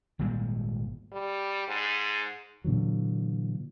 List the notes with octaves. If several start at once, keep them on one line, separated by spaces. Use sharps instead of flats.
G#1 A#2 G3 G#3
G3
G#2
A#2 D3 E3 F#3